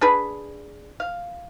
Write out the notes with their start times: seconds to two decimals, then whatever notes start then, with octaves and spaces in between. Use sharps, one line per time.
0.01 D4 G#4 B4
1.00 F5